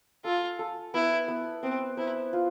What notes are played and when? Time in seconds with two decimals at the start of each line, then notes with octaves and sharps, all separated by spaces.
0.24 F4 A4
0.59 A4
0.94 B3 E4
1.28 B3
1.63 B3 C4
1.97 E4 C5
2.33 F4